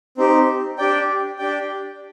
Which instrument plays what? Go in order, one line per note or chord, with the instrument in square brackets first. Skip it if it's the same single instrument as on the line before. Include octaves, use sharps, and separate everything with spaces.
[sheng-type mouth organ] C4 D#4 G4
D4 G4 D5 G5
D4 G4 D5 G5